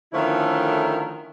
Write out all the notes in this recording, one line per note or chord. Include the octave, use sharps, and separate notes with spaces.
D3 D#3 F3 A3 C#4 E4